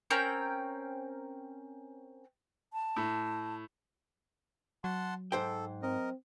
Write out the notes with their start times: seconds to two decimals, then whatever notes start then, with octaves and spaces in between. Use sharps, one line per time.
0.10 C4 C#4 A#4 G5
2.73 A5
2.96 A2
4.84 F#3 F#5 A5 C6
5.32 G#2 A4 C5 G5
5.83 C4 A#4 D#5